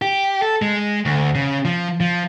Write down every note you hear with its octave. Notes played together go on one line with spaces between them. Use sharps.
G4
A4
G#3
D2
C#3
F3
F3